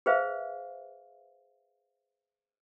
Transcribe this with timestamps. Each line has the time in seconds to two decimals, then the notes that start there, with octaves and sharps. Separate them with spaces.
0.06 G#4 B4 C5 E5 F5